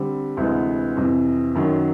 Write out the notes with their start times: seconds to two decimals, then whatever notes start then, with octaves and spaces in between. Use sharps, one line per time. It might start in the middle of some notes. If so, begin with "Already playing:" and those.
Already playing: D3 G3 C4
0.37 D2 C3 E3 G#3 B3
0.97 F2 C3 E3
1.55 F#2 D#3 F#3